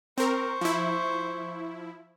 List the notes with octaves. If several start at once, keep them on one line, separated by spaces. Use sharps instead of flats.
C4 A#4 C5 C#6
F3 E4